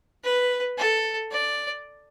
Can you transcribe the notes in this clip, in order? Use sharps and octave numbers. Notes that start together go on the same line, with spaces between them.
B4
A4
D5